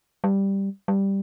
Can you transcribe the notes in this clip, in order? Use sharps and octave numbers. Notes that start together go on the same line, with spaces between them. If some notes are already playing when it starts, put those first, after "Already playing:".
G3
G3